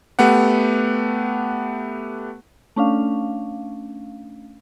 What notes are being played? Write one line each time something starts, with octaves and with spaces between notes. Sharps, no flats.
A3 B3 G4 F#5
A3 C#4 D4 F5